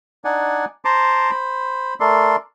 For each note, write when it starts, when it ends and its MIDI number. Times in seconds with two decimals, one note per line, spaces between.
0.25 0.65 62
0.25 0.65 63
0.25 0.65 74
0.25 0.65 78
0.25 0.65 80
0.85 1.31 72
0.85 1.31 81
0.85 1.31 82
0.85 1.31 84
0.85 1.31 86
1.31 1.94 72
1.31 1.94 83
2.00 2.36 57
2.00 2.36 69
2.00 2.36 70
2.00 2.36 74
2.00 2.36 84